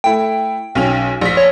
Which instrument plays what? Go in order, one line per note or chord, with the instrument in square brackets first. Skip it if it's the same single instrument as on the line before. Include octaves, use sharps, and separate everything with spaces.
[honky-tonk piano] A3 E4 [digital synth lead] G5
[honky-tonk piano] B1 C#4 F7
A#1 B6
[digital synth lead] C#5